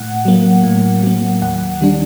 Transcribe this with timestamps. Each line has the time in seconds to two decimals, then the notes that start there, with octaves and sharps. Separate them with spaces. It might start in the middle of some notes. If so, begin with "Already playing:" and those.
Already playing: A2 F#5
0.25 F#3 A#3
0.64 A2
1.03 F#3 A#3
1.42 D#2 F#5
1.81 D#3 G3 D4